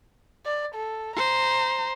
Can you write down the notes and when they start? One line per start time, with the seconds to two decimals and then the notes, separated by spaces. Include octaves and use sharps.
0.46 D5
0.75 A4
1.16 C5 A#5